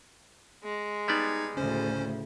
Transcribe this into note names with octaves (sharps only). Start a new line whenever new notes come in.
G#3
G3 B3 D#4 D5 G#6
D2 A2 C#3 C#4 C5